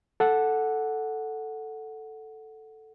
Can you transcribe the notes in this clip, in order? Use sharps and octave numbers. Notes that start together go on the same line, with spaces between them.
A4 F#5